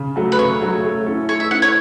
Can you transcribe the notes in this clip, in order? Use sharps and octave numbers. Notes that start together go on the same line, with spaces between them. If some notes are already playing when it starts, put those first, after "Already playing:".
Already playing: C#3
F#3 A3 F#4
B4
C#3 C#5
F#3 A3 F#4
A3
C#4 E4 A4
A3 C#5
E5
C#4 E4 A4 F#5
C#5